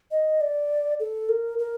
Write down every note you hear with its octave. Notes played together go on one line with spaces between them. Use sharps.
D#5
D5
A4
A#4
A#4